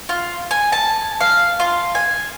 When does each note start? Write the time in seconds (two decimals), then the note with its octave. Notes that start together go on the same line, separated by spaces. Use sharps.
0.09 F4
0.51 G#5
0.72 A5
1.21 F5
1.60 F4
1.95 G#5